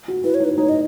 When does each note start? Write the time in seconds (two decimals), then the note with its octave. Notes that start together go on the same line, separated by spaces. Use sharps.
0.08 F#4
0.24 E4 B4
0.34 C#5
0.40 D#4
0.44 B4
0.58 D#4 C#5
0.69 D#5